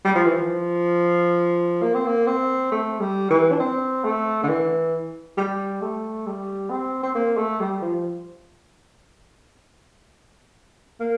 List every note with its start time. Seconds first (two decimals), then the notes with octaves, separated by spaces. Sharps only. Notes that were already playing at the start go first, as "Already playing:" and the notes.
0.05 G3
0.15 F3
0.26 E3
0.37 F3
1.82 A#3
1.95 C4
2.06 A#3
2.27 C4
2.72 A3
3.00 G3
3.31 E3
3.52 D4
3.60 C4
4.05 A3
4.44 D3
4.49 E3
5.38 G3
5.82 A3
6.26 G3
6.70 C4
7.03 C4
7.15 A#3
7.37 A3
7.60 G3
7.82 F3
11.00 A#3